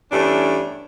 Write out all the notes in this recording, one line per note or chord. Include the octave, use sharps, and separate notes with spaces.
E2 G2 A3 C#4 D4